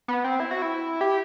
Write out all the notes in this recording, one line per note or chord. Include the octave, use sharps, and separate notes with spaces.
B3
C4
E4
F#4
E4
G4